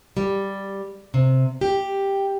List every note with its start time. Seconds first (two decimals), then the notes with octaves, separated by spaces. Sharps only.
0.17 G3
1.14 C3
1.61 G4